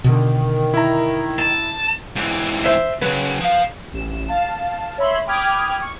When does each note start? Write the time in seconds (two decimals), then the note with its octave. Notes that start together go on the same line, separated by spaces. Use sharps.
0.04 B2 D3 D#3
0.74 E4 A#5
1.39 A5
2.16 G#2 E3
2.64 C5 E5
3.02 C#3 F#3 B4
3.41 F3 F5
3.93 A1 E7
4.29 F5 A5
4.98 C#5 E5 B5 C6
5.27 G5 B5 D6 D#6 F6 G#6
5.81 C#6